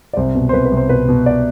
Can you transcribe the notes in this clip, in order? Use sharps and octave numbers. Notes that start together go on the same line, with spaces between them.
D5
C2 C5
B2
C5
C2 B4
B4
C2
C5
B2 B4
B2
D5